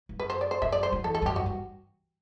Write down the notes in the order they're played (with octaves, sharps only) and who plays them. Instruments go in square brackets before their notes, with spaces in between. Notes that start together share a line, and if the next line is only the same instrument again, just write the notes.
[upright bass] G2
[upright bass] F#2 [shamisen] B4
[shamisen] C5
D5
C5
[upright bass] F#2 [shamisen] E5
[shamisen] D5
C5
[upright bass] F#2
[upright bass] E2 [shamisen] A4
[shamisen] A4
[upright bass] E2
[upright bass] F#2 [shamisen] G4
[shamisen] F#4
[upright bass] G2